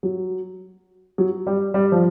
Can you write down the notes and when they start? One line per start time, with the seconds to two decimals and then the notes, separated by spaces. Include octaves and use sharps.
0.03 F#3
1.18 F#3
1.47 G3
1.74 G3
1.92 F3